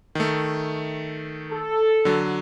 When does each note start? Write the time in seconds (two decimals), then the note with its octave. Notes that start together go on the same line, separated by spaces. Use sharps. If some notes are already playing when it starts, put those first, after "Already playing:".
0.15 D#3 A3
1.51 A4
2.05 D3 F#3